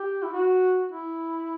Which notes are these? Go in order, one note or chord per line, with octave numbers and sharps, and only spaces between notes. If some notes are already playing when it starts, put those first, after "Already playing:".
Already playing: G4
E4
F#4
E4